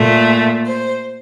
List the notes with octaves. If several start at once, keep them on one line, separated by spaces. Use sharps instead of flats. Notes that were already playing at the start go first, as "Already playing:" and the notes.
Already playing: A#2 A3
C5